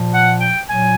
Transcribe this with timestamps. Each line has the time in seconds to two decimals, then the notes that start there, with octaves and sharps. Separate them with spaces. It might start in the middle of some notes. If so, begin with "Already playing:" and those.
Already playing: A#2 F3
0.11 F#5
0.40 G5
0.66 A#2 F#3 G#5